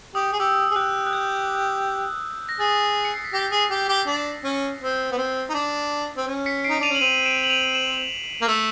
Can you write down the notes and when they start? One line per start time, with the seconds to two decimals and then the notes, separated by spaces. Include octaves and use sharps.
0.15 G4 D#6
0.33 G#4
0.40 G4 E6
0.71 G#4
0.76 G4 F#6
1.07 F#6
1.13 G6
2.49 A#6
2.60 G#4 A6
3.05 C#7
3.14 C7
3.24 B6
3.33 G4 A#6
3.52 G#4
3.70 G4
3.88 G4
4.07 D4
4.44 C#4
4.81 C4
5.11 B3
5.17 C4
5.50 D#4
5.54 D4
6.17 C4
6.27 C#4
6.46 B6 C#7
6.64 D#4 C7 D7
6.80 D4 D#7 F7
6.90 C#4 F#7
7.01 C4 D#7 F7
7.26 D7 E7
7.44 F#7
7.50 D#7 F7
7.74 E7 F#7
8.41 A#3
8.48 A3